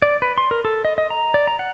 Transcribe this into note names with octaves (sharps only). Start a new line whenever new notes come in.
D5
B4
C6
A#4
A4
D#5
D#5
A#5
D5
A#5
F#5